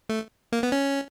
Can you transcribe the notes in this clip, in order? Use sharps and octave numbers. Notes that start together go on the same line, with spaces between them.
A3
A#3
B3
C#4